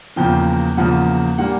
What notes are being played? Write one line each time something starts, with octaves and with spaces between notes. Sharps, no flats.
E2 C#3 F3 A#3 G5
E2 C#3 F3 A#3 F#5
A#2 G3 A#3 F#5